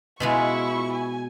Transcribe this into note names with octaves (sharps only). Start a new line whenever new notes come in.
B2 G#3 E4 F4 C#6
G#5